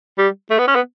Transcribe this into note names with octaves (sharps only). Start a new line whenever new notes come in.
G3
A3
B3
C#4
B3